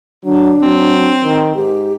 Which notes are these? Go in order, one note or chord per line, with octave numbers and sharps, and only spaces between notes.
D3 F#3 D4
F#3 C4
D#3
G#2 G4